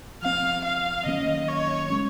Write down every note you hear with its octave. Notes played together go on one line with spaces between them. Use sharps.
F3 C4 F5
F5
D#3 F#3 A#3 C#4 D#5
C#5
D#3 G#3 C#4